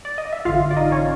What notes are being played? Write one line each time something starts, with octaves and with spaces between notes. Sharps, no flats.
D5
D#5
E5
A1 G2 D3 F4 F5
D5
D#4 D#5
C#4 C#5